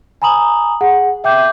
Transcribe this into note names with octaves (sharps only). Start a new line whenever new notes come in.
G#5 A#5 B5 D#6 F#7
G#4 F#5
E5 G5 D6 G6